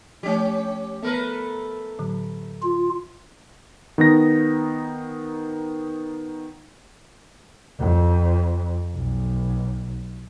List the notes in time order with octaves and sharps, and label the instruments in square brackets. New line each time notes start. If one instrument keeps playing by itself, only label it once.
[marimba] F3 A3 [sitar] C#4 G4
[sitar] A3 A#4 B4 [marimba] B3
[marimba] A2 D3 F#3
[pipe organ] F4
[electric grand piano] D#3 B3 D#4 A#6
[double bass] F2
B1